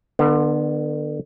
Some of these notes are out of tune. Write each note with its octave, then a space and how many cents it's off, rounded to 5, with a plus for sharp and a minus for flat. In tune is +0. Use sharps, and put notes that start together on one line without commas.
D3 +30 B3 -15